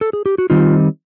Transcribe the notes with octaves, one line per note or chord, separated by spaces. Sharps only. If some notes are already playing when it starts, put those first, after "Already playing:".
A4
G#4
G4
F#4
D#3 G3 C4 D#4 F4